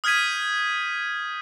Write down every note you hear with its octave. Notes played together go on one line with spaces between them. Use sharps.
D#6 F6 G6 G#6 B6 D#7